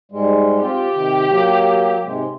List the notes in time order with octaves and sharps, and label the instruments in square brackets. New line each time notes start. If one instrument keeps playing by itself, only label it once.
[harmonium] G#2 G3 G#3
[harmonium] C4 F4 [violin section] G4
[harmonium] C3 D#3
F#3 A#3
G#2 C3 G#3